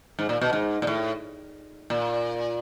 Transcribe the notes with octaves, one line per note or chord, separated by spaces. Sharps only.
G#2
A#2
B2
G#2
A#2
A2
A#2